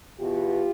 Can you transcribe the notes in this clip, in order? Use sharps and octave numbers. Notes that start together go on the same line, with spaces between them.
E2 B2 F4 G4